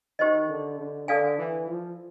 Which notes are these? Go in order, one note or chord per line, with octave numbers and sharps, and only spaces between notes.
D#3 G4 C5 D#5
D3
D3
D3 A4 D5 F5 G#5
E3
F3